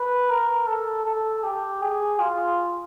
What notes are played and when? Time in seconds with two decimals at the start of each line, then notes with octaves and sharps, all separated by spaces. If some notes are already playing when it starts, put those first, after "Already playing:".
Already playing: B4
0.30 A#4
0.67 A4
1.06 A4
1.44 G4
1.82 G#4
2.20 F4